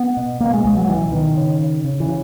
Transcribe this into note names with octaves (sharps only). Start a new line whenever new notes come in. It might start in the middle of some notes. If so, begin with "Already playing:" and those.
Already playing: B3
B2
B2 A#3
G#3
C#2 G#3
F#3
B2 E3
B2 D#3
C#3
C#3
C#3
E3
C#3